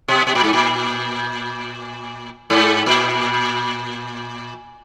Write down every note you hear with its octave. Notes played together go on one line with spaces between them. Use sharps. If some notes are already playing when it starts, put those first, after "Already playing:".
B2
B2
A#2
G#2
A#2
G#2
A#2